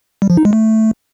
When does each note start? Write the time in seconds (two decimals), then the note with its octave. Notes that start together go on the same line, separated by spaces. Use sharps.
0.22 G3
0.30 F3
0.37 D#4
0.45 G#3
0.53 A3